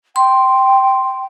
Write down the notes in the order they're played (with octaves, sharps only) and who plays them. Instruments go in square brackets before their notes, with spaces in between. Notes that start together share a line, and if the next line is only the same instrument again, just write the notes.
[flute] G5 [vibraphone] C6